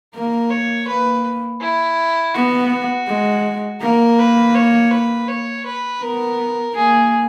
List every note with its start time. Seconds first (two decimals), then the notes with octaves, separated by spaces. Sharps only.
0.14 A#3 A#4
0.50 C#5
0.88 A#3 B4
1.61 E4
2.34 B3 F#4
3.07 G#3
3.81 A#3 A#4
4.19 B4
4.55 C#5
4.91 B4
5.28 C#5
5.66 B4
6.02 B3 A#4
6.75 A#3 G#4